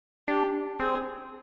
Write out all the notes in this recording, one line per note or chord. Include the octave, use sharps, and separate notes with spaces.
D4 G4
C4 G#4